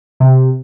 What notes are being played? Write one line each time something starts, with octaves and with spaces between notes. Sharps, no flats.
C3